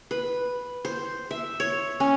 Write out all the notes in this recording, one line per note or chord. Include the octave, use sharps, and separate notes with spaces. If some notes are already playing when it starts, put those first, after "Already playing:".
B4
C5
E5
C#5
C#4